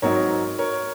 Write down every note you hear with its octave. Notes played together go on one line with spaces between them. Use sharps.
G#2 F#3 C4 D#4 A#4 C#5
A#4 C#5